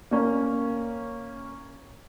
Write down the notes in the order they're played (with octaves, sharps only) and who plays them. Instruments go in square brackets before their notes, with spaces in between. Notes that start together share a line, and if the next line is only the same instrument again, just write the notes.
[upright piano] A#3 C#4